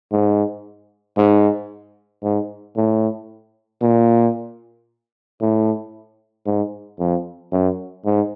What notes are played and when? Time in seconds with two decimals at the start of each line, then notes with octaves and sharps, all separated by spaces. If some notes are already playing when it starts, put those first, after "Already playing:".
0.12 G#2
1.17 G#2
2.23 G#2
2.76 A2
3.82 A#2
5.41 A2
6.46 G#2
6.99 F2
7.52 F#2
8.05 G#2